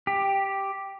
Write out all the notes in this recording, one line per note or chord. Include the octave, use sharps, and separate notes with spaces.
G4